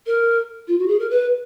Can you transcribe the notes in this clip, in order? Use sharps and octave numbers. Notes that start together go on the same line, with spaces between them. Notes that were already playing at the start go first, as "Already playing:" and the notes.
A#4
F4
F#4
G#4
A#4
B4